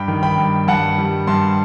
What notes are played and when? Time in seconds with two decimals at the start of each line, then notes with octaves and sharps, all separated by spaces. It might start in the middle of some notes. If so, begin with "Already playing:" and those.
Already playing: G2 G5 B5
0.08 D#3
0.23 G5 B5
0.38 G2
0.68 G2 F#5 A5
0.98 G3
1.27 G2 A5 C6